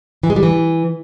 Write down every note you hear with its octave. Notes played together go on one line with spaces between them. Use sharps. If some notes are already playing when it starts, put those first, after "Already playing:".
E3
G#3
G3
E3